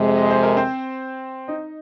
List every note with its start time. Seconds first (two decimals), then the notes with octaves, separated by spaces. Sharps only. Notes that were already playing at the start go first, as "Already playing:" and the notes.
Already playing: F2 C3 G#3
0.17 D#5
0.30 C5
0.43 A#4
0.57 C4 C5
1.48 D#4 D#5